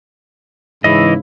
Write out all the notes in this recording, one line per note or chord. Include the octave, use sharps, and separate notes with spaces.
G#2 C#3 E3 E4 D#5